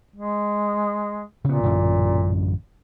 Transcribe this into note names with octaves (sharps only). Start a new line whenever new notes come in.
G#3
A#2 C#3 B3
A1 F#2 D3